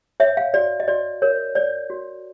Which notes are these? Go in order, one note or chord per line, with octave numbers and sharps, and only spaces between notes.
C#5 E5
F5
F#4 D5
D#5
F#4 D5
A#4 C#5
C#5 D5
F#4